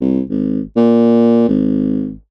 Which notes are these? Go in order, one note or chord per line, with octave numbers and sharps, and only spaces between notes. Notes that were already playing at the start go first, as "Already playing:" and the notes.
C2
G#1
A#2
G#1